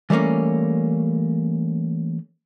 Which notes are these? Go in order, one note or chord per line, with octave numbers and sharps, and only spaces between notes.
E3 G3 A3 A#3 C#4